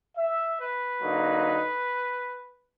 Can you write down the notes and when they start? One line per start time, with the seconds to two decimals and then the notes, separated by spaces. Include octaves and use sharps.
0.17 E5
0.59 B4
1.01 D3 F#3 A#3 D#4